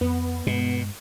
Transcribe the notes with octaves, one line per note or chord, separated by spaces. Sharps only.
F2 B3
G2 B2 G#3